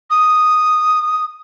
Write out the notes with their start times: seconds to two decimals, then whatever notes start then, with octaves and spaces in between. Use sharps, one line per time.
0.10 D#6